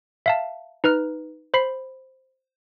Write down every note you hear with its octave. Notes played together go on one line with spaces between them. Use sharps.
E5 F5 A5
D#4 B4 A#5 F6
C5 B5 C7